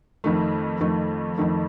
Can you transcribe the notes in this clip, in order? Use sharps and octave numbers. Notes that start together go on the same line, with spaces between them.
F2 D#3 A3
F2 D#3 A3
F2 D#3 A3